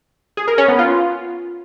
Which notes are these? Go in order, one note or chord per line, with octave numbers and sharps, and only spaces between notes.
G#4
A#4
C#4
B3
F4